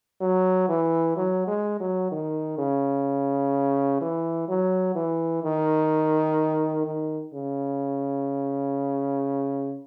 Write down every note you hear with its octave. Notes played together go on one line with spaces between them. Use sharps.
F#3
E3
F#3
G#3
F#3
D#3
C#3
E3
F#3
E3
D#3
D#3
C#3